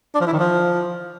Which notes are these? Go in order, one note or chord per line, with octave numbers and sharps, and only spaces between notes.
D4
F3
E4
D#3
F3